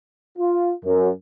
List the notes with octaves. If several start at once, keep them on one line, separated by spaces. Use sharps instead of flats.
F4
F#2